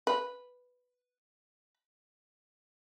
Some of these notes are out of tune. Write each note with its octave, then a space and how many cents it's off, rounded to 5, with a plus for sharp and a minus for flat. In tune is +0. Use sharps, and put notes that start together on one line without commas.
B4 +0